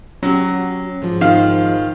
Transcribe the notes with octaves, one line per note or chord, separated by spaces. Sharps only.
F#3 C#4 F#4 G4
G#2 F3
D#3 F5